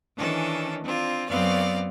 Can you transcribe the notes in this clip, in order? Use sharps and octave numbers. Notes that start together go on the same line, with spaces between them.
D#3 E3 C#4 D4 A4
C4 D4 F4
F#2 B3 C4 D5 F5